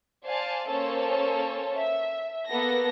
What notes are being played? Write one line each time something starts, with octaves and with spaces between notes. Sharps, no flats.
C5 D5 F5 G#5 A5
A#3 C#4 A4 C5 C#5 A5
E5
A#3 B3 A4 A#6